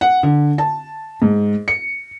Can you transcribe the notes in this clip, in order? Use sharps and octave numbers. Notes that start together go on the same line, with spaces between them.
F#5
D3
A5
G#2
C#7